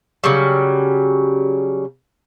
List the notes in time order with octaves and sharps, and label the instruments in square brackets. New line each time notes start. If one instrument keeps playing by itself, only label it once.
[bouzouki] C#3 F#3 G3